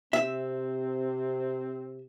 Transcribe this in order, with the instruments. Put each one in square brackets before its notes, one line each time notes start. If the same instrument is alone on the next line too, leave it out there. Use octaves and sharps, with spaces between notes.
[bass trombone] C3 [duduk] C4 [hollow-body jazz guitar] E5